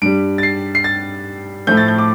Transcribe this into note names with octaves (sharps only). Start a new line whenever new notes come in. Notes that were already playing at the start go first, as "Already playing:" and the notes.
G2 G3 D7
A6
C7
C7
A6
A2 F3 A3 G6
A6
G6
D6